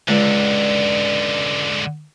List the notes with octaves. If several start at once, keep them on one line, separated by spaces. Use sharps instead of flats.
C#2 G#2 D3 D5